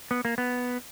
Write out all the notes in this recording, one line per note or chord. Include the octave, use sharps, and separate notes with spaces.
B3
A#3
B3